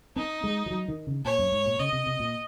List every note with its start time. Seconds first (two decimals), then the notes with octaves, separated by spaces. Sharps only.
0.16 C4 D#4
0.44 G#3
0.66 F3
0.71 F#3
0.88 D#3
1.07 C#3
1.25 A#2 C#5
1.39 F#2
1.52 G#2
1.66 A#2
1.79 C#3 D#5
1.93 C3
2.07 C3
2.20 A#2